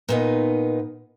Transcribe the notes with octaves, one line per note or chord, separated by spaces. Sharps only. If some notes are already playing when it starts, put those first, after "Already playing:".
A#2 B3 D#4